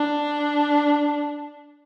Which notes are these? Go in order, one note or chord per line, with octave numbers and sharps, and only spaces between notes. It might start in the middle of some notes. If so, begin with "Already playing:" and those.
Already playing: D4